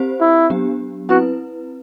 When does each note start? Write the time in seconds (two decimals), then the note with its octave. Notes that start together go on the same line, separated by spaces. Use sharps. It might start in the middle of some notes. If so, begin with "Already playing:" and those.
Already playing: C4 G4 C5
0.20 E4
0.50 F#3 B3 D4 G4
1.09 C4 E4 F#4 B4